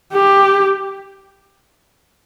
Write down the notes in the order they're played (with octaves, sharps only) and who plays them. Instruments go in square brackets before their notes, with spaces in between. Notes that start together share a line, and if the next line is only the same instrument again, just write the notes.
[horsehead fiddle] G4